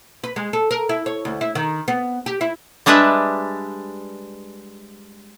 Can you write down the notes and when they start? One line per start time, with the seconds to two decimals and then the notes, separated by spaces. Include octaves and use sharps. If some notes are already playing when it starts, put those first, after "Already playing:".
0.24 B4
0.36 G#3
0.53 A4
0.71 A#4
0.89 E4
1.06 C#5
1.25 D2
1.41 E4
1.55 D#3
1.88 B3
2.26 G4
2.41 E4
2.86 G3 G#3 D4 B4 E5